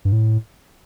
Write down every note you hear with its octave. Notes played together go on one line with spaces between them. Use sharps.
G2
A2